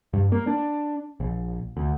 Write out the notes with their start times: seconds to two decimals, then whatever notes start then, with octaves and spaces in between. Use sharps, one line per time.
0.13 G2
0.32 A#3
0.47 D4
1.20 A#1
1.77 D2